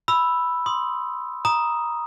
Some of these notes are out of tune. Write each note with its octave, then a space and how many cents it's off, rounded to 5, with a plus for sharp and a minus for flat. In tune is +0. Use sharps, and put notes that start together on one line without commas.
B5 +0 E6 +0
C6 +0 D#6 +0
A#5 +20 D#6 +0